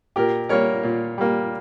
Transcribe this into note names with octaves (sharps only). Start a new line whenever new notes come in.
A#2 G4 A#4
G3 A#3 A#4 C#5
A#2
G3 A#3